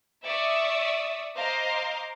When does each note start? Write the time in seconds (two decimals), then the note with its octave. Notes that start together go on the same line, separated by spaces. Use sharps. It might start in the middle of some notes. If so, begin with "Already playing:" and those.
0.24 D5 E5 C#6 D#6 E6
1.36 C5 D#5 F5 A#5 C6 D6